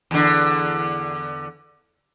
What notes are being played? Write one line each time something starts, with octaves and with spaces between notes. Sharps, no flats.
E2 D3